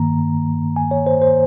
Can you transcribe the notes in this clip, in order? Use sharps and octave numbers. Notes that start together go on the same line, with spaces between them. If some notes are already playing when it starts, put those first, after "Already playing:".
Already playing: G2 D#3 A#3 A#5
G#5
C#5
C5
C5